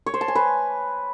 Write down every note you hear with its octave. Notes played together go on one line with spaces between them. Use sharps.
C#5
C5
A5
G#5
B4